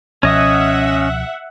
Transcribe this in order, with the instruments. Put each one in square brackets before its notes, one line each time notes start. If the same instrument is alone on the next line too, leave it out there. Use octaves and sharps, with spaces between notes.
[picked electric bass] C#2 B2 F3 [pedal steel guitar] C#4 D#5 D#6 [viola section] E5 F#5